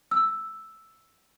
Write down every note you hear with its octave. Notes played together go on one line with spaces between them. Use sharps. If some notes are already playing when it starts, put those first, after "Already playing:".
E6